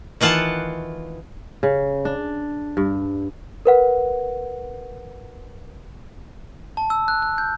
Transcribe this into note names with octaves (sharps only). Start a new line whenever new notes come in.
D#3 E3 F4 F#5 A5
C#3
D4
G2
A#4 B4 F#5
A5
E6
F#6
F#6
G6